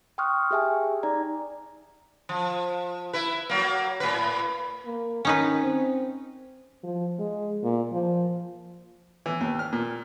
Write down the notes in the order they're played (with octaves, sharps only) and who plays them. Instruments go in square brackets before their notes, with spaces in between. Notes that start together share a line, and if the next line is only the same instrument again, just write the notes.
[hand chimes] G5 C6 C#6 D#6 F6 F#6
G4 G#4 E5 G5 G#5
D#4 D5 A#5
[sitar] F3
E4 B4
F#3 A#3
A2 B4
[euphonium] A#3
[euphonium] D#3 [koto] C#4 D#4 B4
[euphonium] C4
[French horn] F3
G#3
A#2
F3
[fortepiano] E3
D#2
F6
A#2